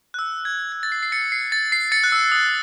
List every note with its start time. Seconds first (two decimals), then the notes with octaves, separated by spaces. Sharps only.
0.14 F#6
0.19 E6
0.45 G#6
0.72 G#6
0.83 A6
0.92 C7
1.03 C7
1.12 A6 C#7
1.32 C7
1.52 A6
1.72 C7
1.92 A6 C#7
2.04 F#6
2.12 E6
2.32 D#6